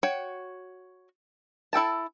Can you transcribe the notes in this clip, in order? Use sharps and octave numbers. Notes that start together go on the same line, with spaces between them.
F#4 C#5 G5
E4 A4 G5 A5